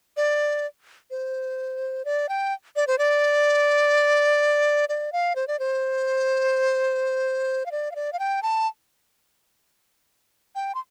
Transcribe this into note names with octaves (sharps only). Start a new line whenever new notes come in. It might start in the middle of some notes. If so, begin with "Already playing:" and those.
D5
C5
D5
G5
D5
C5
D5
D5
F5
C5
D5
C5
F5
D5
F5
D5
F5
G5
A5
G5
C6